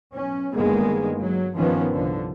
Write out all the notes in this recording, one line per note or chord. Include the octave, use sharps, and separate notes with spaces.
B1 C#4
G1 G2 D#3 G#3 A#3 B3
F#3
G2 D#3 F3 B3 C#4
C2 D3 F3